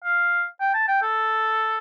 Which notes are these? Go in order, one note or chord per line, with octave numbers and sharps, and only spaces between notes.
F5
G5
A5
G5
A4